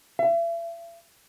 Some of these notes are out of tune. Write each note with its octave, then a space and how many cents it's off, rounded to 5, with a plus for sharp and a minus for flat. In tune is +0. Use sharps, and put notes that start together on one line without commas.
E5 +40